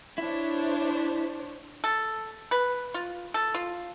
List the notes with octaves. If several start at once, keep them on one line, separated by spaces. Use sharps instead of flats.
D4 E4 C5 C#5
A4
B4
F4
A4
F4